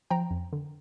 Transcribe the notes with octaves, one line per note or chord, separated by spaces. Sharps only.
F3 G5 A#5
F2
D3